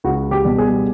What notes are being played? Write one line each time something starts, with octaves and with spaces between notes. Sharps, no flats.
C#2 F#4
G4
B2 G3
G#4